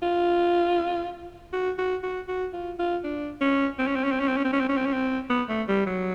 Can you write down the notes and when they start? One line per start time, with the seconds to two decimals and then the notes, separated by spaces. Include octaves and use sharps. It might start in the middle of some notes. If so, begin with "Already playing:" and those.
0.02 F4
1.53 F#4
1.78 F#4
2.03 F#4
2.28 F#4
2.53 F4
2.79 F4
3.04 D4
3.41 C#4
3.79 C4
3.87 C#4
3.96 C4
4.04 C#4
4.12 C4
4.20 C#4
4.28 C4
4.37 C#4
4.45 C4
4.53 C#4
4.61 C4
4.69 C#4
4.77 C4
4.86 C#4
4.94 C4
5.30 B3
5.49 A3
5.69 G3
5.86 F#3